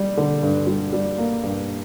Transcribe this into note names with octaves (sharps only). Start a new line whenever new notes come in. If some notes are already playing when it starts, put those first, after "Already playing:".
Already playing: G3
D3
G2
G3
G3
A#3
G2